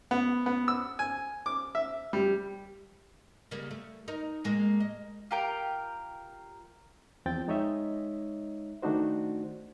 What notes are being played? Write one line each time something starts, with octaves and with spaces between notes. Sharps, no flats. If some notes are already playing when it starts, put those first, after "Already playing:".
B3
B3
E6
G#5
D6
E5
G3
C#3 G3 A#3
A3
D#4 A#4
A2 G#3 A#3
D#5
F4 G4 A#4 G5
E2 F3 C4 G5 G6 A6
G#3 D#4 C#5 D#5 E5
D#3 A3 D4 D#4 F#4 C5